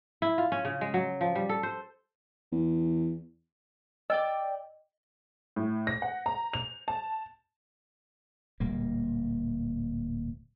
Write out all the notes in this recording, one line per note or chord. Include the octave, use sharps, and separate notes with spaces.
E4
F4
C#4
C#3
G#3
F#3
F3
G3
A4
C5
E2
D5 D#5 G5 E6
A2
A#6
F#5
A#5
F7
A5
D1 A#2 G3 A#3